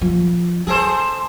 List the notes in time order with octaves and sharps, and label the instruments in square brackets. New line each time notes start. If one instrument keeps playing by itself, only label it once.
[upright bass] F3
[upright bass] G#3 [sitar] G#4 A4 C5